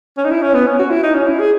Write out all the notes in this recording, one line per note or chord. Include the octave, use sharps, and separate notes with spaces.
C#4
D#4
E4
C#4
B3
C#4
F#4
E4
D#4
C#4
E4
G#4